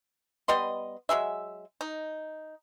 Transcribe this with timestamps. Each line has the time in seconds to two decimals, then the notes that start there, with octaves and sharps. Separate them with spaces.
0.48 G3 B3 D#5 C6
1.09 F#3 G#3 G#4 E5
1.81 D#4